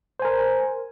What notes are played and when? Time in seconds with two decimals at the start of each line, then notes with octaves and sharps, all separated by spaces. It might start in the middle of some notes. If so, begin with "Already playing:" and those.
0.19 C5
0.22 G#5
0.25 A#4